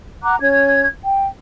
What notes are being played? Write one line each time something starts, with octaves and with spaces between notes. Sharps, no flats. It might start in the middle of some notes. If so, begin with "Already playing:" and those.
F#5 A#5 D6 F#6
C#4 C#5 G#6
G5